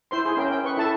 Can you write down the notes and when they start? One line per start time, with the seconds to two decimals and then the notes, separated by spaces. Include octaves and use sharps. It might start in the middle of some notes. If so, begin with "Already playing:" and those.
0.11 E4 C5 C6
0.25 G#4
0.37 C#4 A#4 G5
0.51 G5
0.64 B4 C#6
0.77 E4 A4 E5 A5